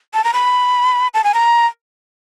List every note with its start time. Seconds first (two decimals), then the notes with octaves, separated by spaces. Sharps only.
0.14 A5
0.24 A#5
0.34 B5
1.14 A5
1.24 G#5
1.34 A#5